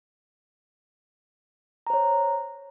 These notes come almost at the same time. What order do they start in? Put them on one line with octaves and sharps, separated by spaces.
A#5 C5 C#5